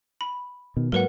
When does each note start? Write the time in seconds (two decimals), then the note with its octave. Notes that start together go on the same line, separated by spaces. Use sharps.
0.21 B5
0.77 B2 D#3
0.92 G#2 F#3 A#3 A#4 B4 F#5